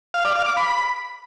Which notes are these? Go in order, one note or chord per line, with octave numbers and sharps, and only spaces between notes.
F5
D5
F5
D6
B5